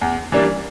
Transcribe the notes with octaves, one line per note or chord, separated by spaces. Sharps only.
E2
E3 G3 A#3 D4